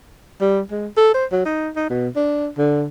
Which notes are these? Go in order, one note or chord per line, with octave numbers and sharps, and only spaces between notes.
G3
G#3
A4
C5
F#3
D#4
D#4
B2
D4
D3